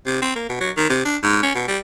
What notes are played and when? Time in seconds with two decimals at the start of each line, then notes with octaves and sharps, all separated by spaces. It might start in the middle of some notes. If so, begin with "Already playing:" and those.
0.06 C3
0.22 C4
0.35 A#3
0.49 B2
0.60 F#3
0.77 D#3
0.90 C3
1.05 D4
1.23 G#2
1.43 C#4
1.55 B2
1.68 G3